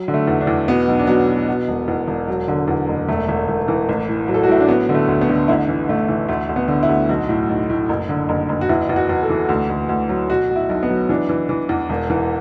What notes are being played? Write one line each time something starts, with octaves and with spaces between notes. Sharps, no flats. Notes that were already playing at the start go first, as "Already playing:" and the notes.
Already playing: F#3
D3
A3
E2
D4
E2
B2 B3
B1
D4
F#3 B3
B2
B2
E1
E2
E1
F#3
D3
E2
F#1
E1 A3
E1
E1
E3
A1
A2
F#3
A4
F#4
A2 E4
D4
F#3 B3
D3
A3
D2
B3
D3
A1 E4
E3
A1 A3
E3
D2 A3
D2
B3
D3
E4
D2
B1 F#4
A2
B1
A2
F#1
D3
F#1
F#1
F#4
E2 E4
E2
F#4
E2
A4
E3
D2
D2
D2
F#3
B2 F#4
B2
E4
B1
B3
F#3
E3 D4
E3
E3
E2
E1
E3